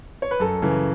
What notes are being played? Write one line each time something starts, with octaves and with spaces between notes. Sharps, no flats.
C#5
B4
F#2 A4
C#3 E3